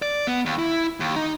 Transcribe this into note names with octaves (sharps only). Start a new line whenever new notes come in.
D5
B3
D#2
E4
D#2
D#4